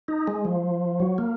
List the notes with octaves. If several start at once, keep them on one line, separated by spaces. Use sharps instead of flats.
D#4
G#3
F3
F#3
A#3